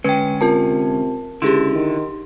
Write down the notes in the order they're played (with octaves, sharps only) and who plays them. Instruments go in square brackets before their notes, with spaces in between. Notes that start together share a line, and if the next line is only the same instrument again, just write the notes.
[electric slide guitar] D3 G#3 C#4 [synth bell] B4 G5
[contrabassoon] C3 [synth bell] F4 A#4 A5
[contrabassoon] C#2 [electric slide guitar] D3 E4 [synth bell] G4 G#4 C6
[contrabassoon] D#3